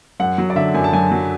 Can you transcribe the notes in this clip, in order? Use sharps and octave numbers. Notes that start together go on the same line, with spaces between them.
F#2 F#5
F#3
D5
D3 E5
F#2 G#5
A5
F#2 G#5
F#3